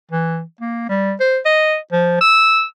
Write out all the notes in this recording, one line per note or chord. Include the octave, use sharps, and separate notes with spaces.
E3
A#3
G3
C5
D#5
F3
E6